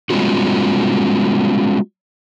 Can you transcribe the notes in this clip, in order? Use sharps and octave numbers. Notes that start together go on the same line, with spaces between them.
G3 G#3 B3 C#4 F4 F#4